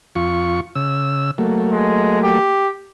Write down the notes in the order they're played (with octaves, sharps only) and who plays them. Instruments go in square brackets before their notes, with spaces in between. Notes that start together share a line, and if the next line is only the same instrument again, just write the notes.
[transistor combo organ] F2 F4 C#6
C#3 E6
F#3 A3 A#3
[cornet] G#3
G4